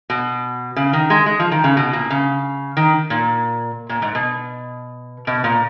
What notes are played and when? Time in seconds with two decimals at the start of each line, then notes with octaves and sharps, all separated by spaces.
0.10 B2
0.76 C#3
0.93 D#3
1.10 G#3
1.26 G#3
1.39 F3
1.52 D#3
1.64 C#3
1.77 B2
1.93 A#2
2.10 C#3
2.77 D#3
3.10 A#2
3.89 A#2
4.02 G#2
4.15 B2
5.27 B2
5.44 A#2